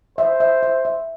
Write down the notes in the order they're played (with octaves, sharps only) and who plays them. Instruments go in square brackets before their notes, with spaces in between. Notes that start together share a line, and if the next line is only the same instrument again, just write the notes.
[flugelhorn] C5 [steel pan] E5
[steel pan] E5
E5
E5